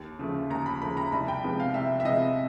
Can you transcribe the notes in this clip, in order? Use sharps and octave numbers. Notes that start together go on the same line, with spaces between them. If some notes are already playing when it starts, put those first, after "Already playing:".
Already playing: D#2
C#3 F3 A3
D#2 A#5
B5
C#3 F3 A3 B5
A#5
C2 B5
G5
C3 F3 G#3 B3
F5
C2 E5
E5
C3 F3 G#3 B3 D#5